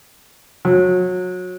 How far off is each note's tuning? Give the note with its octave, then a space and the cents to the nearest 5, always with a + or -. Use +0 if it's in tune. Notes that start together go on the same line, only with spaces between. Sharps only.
F#3 -25